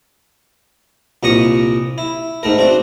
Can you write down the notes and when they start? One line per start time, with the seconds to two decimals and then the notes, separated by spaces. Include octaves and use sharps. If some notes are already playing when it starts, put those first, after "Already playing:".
1.23 C2 A#2 D#5 C#6 D#6
1.98 E4
2.43 G#2 A3 A#4
2.58 C4 D4 F#4